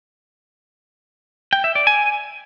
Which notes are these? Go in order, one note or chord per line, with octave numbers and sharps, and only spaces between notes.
G5
E5
D5
G#5